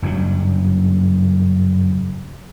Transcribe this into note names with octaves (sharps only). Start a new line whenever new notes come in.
F#1 G2 A#2 F#3